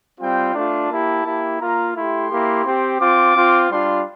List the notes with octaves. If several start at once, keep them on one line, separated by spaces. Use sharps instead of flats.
G3 C4 F4 G5
A3 D4 F4 A5
A#3 E4 G4
A#3 E4 G4
A#3 F4 A#5
A3 E4 G4 C6
A#3 E4 G4
C4 G4
C4 F4 D6
C4 F4
G3 D4 F4 C6